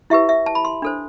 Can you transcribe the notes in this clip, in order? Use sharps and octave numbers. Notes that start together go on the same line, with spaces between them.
E4 G4 B4 E5
E5
A5
B5
C6
D4 A4 C5